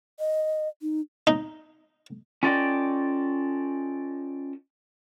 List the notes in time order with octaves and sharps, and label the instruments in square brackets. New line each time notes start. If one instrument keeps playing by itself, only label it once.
[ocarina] D#5
D#4
[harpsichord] D#4
[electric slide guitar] C#4 F4 A4 D5 D#5 G5